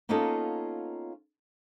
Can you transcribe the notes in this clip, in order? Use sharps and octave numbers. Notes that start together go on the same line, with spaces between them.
A#3 B3 C#4 D#4 F4 A4